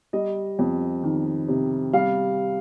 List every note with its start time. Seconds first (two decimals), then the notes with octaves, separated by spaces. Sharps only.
0.13 G3 D#5
0.59 F2
1.03 D#3
1.48 C3
1.93 G3 F5